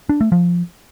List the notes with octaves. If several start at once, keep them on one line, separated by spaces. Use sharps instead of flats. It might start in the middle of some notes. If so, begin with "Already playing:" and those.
D4
A3
F3